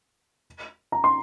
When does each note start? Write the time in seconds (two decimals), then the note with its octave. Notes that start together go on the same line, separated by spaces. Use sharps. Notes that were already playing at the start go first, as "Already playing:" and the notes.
0.92 A#5
1.04 C6